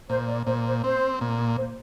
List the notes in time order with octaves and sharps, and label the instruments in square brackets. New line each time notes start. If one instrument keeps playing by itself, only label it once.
[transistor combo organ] A#2 [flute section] C5
[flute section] D5
[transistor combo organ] A#2 [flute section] C5
[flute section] C5
[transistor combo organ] C4 [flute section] C5
[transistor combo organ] A#2
[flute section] C5